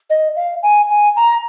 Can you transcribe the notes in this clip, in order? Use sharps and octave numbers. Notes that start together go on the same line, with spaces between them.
D#5
F5
G#5
G#5
A#5